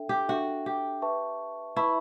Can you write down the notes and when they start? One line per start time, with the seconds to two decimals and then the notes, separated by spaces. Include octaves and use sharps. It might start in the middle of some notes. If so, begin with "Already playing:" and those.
Already playing: D4 A4 E5 G5
0.09 G4
0.28 D4 F#4 A4 E5 G5
0.66 G4
1.02 B4 E5 A5 C#6
1.76 E4 B4 E5 A5 C#6